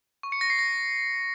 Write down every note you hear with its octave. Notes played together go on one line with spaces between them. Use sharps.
C#6
C#7
A#6
C7
A#6